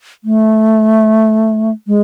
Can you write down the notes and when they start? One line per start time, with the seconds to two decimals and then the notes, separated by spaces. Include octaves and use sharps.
0.24 A3
1.87 G#3